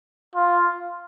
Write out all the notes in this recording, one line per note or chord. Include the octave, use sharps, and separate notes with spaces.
F4